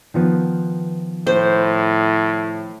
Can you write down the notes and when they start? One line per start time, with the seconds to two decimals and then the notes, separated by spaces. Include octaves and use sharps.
0.14 D#3 F3 B3
1.27 A2 C5